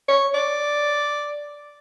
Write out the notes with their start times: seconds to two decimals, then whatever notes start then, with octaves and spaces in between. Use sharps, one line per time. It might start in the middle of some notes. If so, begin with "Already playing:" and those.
0.08 C#5
0.34 D5